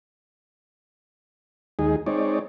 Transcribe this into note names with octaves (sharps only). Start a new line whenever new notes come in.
D#2 G#3 D#4 G#4
G#3 C4 D#4 C#5 D5